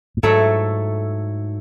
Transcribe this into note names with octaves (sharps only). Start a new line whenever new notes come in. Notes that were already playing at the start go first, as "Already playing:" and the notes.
A2
G#2 F#3 A3 E4 A4